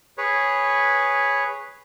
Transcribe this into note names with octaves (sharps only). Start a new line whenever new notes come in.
G#4 B4 C#5